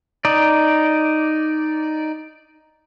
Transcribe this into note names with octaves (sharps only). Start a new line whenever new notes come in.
D#4 D5